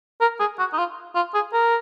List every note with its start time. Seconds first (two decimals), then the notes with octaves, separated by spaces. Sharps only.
0.21 A#4
0.40 G#4
0.59 F#4
0.73 D#4
0.78 F4
1.15 F4
1.34 G#4
1.53 A#4